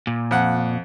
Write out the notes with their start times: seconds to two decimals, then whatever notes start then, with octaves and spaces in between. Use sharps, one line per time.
0.07 A#2
0.31 F2 F#5